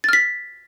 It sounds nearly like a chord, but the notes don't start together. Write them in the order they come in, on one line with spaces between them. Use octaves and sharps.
A6 F6 B6